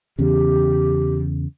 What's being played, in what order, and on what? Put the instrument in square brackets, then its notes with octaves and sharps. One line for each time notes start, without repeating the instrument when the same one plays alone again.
[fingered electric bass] E2 C#3 [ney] G4